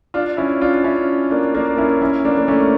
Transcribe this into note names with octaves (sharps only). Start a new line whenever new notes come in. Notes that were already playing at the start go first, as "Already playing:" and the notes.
D4 F4
C#4 E4
D4 F4
C#4 E4
A#3 D4
A#3 D4
C#4 E4
C#4 E4
A#3 D4
A#3
A3 C#4